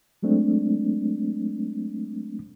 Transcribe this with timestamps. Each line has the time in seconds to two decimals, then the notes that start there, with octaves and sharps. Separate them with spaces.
0.23 F#3 G#3 A3 C4 D4